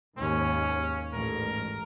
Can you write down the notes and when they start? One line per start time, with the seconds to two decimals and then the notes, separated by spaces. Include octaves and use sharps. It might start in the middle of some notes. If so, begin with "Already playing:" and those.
0.18 D#2 G#2 C#4
1.14 A1 G#2 A#4